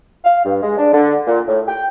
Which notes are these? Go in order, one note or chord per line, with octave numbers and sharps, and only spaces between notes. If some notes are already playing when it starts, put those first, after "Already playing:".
F5
G2
G#3
D4
D3
A#2
A2
G5